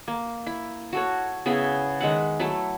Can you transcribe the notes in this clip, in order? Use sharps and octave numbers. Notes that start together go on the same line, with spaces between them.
A#3
E4
F#4 A4 C#5
C#3 B3 E4 G#4
D#3 G#3 E5 F#5
F#3 A3 E4 A4